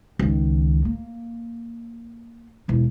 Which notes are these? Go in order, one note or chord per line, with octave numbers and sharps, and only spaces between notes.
C#2 D#3
A#3
E1 E2